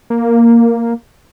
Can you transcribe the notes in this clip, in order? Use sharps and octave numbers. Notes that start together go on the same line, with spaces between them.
A#3